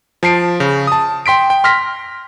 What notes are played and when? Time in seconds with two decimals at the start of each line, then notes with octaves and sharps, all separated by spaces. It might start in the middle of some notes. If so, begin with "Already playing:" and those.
0.23 F3 A5 C7 D7
0.60 C#3
0.87 A5 D#6
1.26 G5 C6 B6 D7
1.50 G5
1.64 C6 F6 A#6 B6